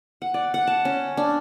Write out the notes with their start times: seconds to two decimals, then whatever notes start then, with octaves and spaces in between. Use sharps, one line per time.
0.22 F#5
0.34 D5
0.54 F#5
0.67 A5
0.85 C#4
1.17 D4